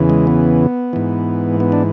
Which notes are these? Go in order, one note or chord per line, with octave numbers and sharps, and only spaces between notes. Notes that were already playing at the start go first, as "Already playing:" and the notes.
Already playing: E2 C#3 E3
G#3
B3
G#2 E3
B3
D4